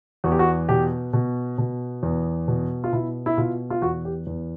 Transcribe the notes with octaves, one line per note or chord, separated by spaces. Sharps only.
E2 F#4
G4
F#4
B2 G4
B2
B2
E2
B2
F4
B2 E4
E4
B2 F4
F4
E2 F#4
G4
E2